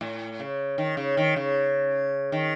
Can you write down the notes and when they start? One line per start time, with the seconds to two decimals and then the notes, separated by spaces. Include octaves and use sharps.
0.01 A2
0.39 C#3
0.78 D#3
0.97 C#3
1.17 D#3
1.36 C#3
2.32 D#3